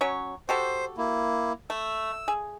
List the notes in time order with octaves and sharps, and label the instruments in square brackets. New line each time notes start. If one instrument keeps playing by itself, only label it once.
[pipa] F#3 C#4 C#5
[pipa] F#4 G4 A4 [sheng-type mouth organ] C5
[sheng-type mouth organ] A#3 E4
[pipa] A3 [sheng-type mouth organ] E6
[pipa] G#4